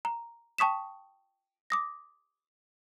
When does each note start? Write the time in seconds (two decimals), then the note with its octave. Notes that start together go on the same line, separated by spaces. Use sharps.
0.05 A#5
0.58 G5 A5 C#6 D#6 B6 E7
1.70 D6 D#6 A#6